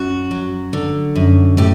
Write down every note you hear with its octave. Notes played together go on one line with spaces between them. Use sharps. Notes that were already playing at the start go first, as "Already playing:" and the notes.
Already playing: F#2 F#4
F#3
D3
F#2
A2 G4